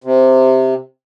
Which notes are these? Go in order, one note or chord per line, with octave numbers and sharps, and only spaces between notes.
C3